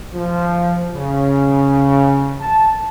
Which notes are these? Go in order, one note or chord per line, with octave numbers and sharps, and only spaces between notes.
F3
C#3
A5